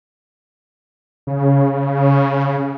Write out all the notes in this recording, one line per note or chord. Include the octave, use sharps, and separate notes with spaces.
C#3